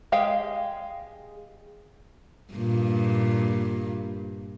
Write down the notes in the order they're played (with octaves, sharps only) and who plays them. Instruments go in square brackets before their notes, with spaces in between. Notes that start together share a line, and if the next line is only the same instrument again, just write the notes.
[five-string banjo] G#3 G4 F5 G5
[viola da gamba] G2 A#2